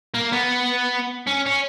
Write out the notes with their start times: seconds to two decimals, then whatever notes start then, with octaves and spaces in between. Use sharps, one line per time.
0.14 A#3
0.33 B3
1.27 C#4
1.46 C#4